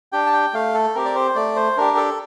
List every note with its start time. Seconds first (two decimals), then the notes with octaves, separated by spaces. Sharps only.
0.12 D4 G4 G5
0.26 A5
0.33 G5
0.53 A3 F5
0.74 A4
0.95 C4 G4 A#4
1.05 D5
1.15 C5
1.36 A3 D5
1.56 C5
1.77 D4 G4 A#4
1.97 A4